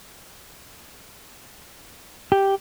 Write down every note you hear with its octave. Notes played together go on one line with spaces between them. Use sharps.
G4